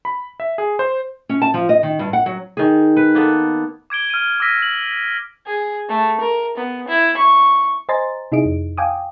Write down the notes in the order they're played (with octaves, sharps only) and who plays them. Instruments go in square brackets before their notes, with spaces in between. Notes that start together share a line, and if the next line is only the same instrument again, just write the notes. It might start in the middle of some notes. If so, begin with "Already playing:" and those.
[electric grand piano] B5
E5
G#4
C5
[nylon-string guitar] C#4
A5
F3
D#5
D#3
G2
F#5
F#3
[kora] D#3 G#4
B4
A#3 B3 A4
[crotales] D6 G#6 D7 G7
F6 D#7
D6 E6 F6 A#6 B6 D#7
F#7
[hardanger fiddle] G#4
A3
A#4
B3
E4
C#6
[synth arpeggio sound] C5 D#5 G#5 A#5 C6 A6
C3 D#4 E4 G#4 D#5 D7
F2
F5 G5 G#5 D6 D#6